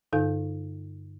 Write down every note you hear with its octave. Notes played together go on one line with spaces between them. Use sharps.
G2 D3 D#4 A4 F5 G6